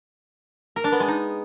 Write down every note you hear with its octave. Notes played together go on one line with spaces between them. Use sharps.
A#4
D4
B3
G#3
D#4